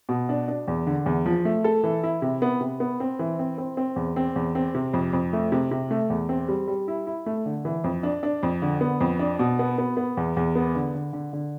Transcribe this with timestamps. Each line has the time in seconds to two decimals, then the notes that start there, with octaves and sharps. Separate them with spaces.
0.09 B2
0.29 D4
0.48 D4
0.68 E2
0.87 D3
1.06 E2
1.26 F3
1.45 A3
1.64 A4
1.84 E3
2.03 E4
2.22 C3
2.42 B3
2.61 C3
2.80 B3
3.00 C4
3.19 E3
3.39 C4
3.58 C4
3.77 C4
3.96 E2
4.16 C4
4.36 E2
4.55 C4
4.75 C3
4.94 F2
5.13 F2
5.33 A3
5.52 C3
5.71 C3
5.91 A3
6.10 E2
6.29 C4
6.48 G3
6.67 G3
6.88 E4
7.07 E4
7.26 A3
7.46 D3
7.65 E3
7.84 F2
8.03 D4
8.23 D4
8.43 F2
8.62 D3
8.81 B3
9.01 F2
9.19 D4
9.39 B2
9.59 B3
9.78 B3
9.97 B3
10.17 E2
10.37 E2
10.55 B3
10.75 D3
10.94 D3
11.13 D3
11.33 D3